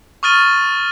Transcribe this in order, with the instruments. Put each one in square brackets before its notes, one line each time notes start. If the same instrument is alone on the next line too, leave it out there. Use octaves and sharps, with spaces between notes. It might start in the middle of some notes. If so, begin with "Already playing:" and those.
[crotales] C#6 D#6 F6 A6 D#7 G7